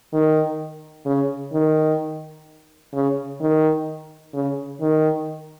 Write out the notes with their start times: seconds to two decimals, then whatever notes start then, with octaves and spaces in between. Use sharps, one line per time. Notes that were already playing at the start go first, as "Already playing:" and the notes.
0.13 D#3
1.06 C#3
1.53 D#3
2.93 C#3
3.41 D#3
4.34 C#3
4.80 D#3